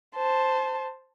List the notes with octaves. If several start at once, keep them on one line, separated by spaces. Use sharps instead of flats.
C5 A5